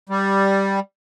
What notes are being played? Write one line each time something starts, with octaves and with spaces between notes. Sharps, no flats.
G3